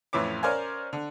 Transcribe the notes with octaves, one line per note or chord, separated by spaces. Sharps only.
F2 A2 E3 C#4 D6
C#4 A#4 C5 D5 F5 G#5
D3